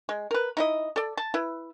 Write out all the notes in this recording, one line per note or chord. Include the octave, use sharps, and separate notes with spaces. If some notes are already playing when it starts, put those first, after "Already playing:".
G#3
A#4 B4
D#4 E4 D#5
A4 D5
A5
E4 B4